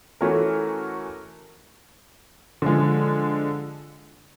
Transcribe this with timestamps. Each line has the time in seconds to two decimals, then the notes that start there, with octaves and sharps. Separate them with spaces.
0.21 E3 A3 C#4 F#4 A#4
2.62 D3 F3 G#3